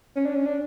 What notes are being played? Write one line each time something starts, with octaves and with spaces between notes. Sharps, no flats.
C#4
D4
C#4
D4